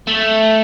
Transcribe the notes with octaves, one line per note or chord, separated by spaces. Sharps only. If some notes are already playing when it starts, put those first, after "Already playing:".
A3